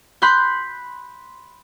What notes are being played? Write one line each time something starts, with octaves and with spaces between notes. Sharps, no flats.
B5 C6 F#6 G6